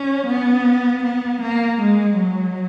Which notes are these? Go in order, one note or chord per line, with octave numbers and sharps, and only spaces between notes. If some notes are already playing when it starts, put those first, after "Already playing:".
Already playing: C#4
B3
B3
A#3
G#3
F#3